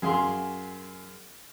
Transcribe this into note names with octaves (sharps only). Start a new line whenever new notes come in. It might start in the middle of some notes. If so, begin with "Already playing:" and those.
F#2 G#4 F5 C6